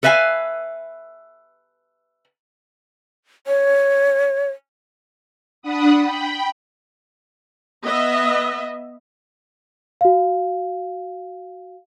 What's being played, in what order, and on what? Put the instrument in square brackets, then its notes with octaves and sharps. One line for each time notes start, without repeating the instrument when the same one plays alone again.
[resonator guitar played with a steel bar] A4 B4 E5 F5 G#5
[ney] C#5
[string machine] D4 F#5 B5 D#6
G5 B5
[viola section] B3 D#5 E5
[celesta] F#4 F5